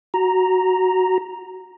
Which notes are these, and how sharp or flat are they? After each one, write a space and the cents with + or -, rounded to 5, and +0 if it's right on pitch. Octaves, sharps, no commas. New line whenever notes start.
F#4 +5 A#5 +0